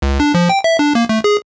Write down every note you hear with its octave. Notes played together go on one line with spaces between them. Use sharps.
C#2
D4
F3
G5
E5
D4
A#3
A3
G#4